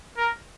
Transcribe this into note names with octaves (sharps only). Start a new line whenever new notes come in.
A#4